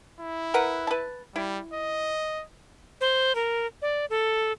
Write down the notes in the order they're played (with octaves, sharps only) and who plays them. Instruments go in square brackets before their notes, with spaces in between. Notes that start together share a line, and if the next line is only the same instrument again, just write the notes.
[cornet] E4
[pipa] A#4 B4 F#5
B4 A5
[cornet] G3 [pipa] E4
[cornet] D#5
[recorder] C5
A#4
D5
A4